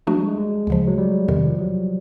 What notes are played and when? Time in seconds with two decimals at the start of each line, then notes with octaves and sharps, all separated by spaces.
0.07 F3 G#3 A3 D4 F#4
0.17 G3
0.27 G#3
0.38 G#3
0.67 D2 C#3 F3
0.87 F#3
0.98 G3
1.28 E2 C3 D#3 G#3
1.47 F3
1.59 F#3